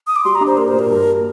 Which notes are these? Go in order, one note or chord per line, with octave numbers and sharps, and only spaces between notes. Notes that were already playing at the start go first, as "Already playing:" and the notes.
D#6
D6
G3 C6
A#5
D4
C5
A#3 A#4
C5
A#2
A#4
G2
A#3